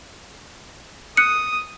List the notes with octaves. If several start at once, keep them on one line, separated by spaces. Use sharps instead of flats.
D#6 F#6 C#7